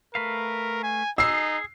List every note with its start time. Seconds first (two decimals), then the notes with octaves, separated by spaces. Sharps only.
0.15 A3 A#4 B4 F5
0.83 G#5
1.18 D#4 G#4 E6 C7